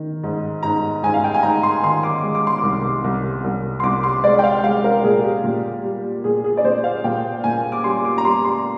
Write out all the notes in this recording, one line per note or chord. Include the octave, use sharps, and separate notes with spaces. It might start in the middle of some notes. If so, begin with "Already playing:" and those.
Already playing: D#3
G#2
G#2 A#5
G#2 G#5
F5
G5
G#5
G#2 A#5
C6
D#3 C6
D6
G#3
D6
C6
C2 D6
C2
C2
C6
C2 D6
C6
G#3 D5
G5
F5
G#3 F5
A#4
A#2 G#4
G4
A#2
G3
A#2 G#4
G#4
D5
A#2 C5
F5
A#2 G5
A#2 G#5
D6
G3 C6
D6
A#5
G3 C6
C6